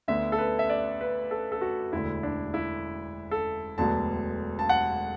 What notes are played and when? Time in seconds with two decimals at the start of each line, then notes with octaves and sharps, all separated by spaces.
0.08 D2 D3 B3 E5
0.32 A4
0.38 B4
0.59 E5
0.70 D5
1.01 B4
1.31 A4
1.52 A4
1.61 F#4
1.93 E1 D2 D3 E4
2.23 D4
2.54 E4
3.31 A4
3.77 E1 D2 D3 F#3 B3 A5
4.59 A5
4.69 F#5